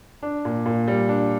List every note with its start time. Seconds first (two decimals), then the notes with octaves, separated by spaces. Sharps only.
0.23 D4
0.45 A#2
0.66 A#2
0.88 G3
1.09 D4